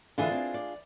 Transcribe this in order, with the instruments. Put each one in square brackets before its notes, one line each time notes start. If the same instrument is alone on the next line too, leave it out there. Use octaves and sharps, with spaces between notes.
[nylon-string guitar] D3 E3 [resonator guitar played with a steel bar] D4 F4 G#4
[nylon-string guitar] C4
D5